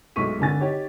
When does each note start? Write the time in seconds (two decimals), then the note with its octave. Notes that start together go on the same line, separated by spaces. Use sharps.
0.16 B1 G#3 A3 C#6 B6 D#7
0.39 G#1 D3 G#5 A6
0.61 D#4 G4 C#5